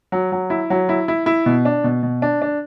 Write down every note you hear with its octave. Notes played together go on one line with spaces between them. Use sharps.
F#3
F#3
E4
F#3
E4
E4
E4
B2
D4
B2
B2
D4
D4